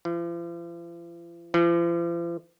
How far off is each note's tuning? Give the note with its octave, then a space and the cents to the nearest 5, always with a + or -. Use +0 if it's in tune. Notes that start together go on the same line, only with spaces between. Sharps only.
F3 -45
F3 -45